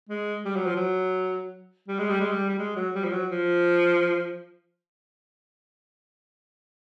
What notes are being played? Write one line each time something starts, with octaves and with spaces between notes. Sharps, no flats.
G#3
G3
F#3
F3
F#3
G3
G#3
G3
G#3
G3
G3
G#3
F#3
G3
F3
F#3
F3